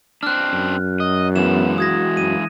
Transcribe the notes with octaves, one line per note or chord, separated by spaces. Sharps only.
C4 D4 F6 F#6
F#2
F#3 D#5
E3 G#3 B3 E7
F#4 D#6 G#6 A#6
F#2 D#7